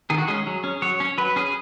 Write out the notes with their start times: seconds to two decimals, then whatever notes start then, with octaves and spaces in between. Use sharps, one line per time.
0.10 D#3 G#4
0.18 F#4
0.28 G#3 C#4 G#4
0.47 F#3
0.64 C#4
0.82 F#3 C#5
1.00 C#4
1.18 F#3 B4
1.36 C#4 G#4